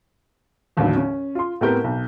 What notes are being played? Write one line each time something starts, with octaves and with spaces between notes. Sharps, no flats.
A1 D#2 A2 D3 E3 F#3
C#4
F4 C6
A2 B3 C4 G4 A#4 G6
B1